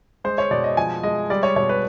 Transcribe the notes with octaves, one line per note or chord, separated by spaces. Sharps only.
G#3 C5
C#5
B2 D5
D#5
F3 G#5
G#3 D#5
G3 D5
C#5
B2 C#5
B4